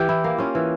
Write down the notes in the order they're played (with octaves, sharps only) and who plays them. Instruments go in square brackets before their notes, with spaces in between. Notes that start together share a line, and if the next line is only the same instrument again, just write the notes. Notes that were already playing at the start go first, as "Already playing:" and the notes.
Already playing: [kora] E3 G4
E4
A#3
C#4 F4
E3